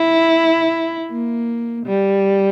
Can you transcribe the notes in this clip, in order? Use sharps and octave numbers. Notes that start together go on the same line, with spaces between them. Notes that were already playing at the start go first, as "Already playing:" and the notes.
Already playing: E4
A#3
G3